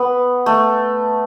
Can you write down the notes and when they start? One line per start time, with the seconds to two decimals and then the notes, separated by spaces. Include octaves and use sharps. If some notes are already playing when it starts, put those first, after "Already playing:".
Already playing: B3
0.46 A3